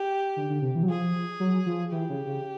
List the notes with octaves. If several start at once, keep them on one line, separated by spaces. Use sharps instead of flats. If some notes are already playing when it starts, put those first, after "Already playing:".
Already playing: G4
D3
D3
C3
E3
F#3
F3 G#4
F#3
F3
E3 G4
C#3
C#3